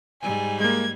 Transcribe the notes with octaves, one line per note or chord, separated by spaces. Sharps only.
G#2 G3 G#5
G#3 A#3 G#6